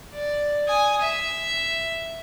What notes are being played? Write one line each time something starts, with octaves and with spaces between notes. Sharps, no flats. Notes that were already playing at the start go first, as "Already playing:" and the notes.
D5
G#5 D#6
E5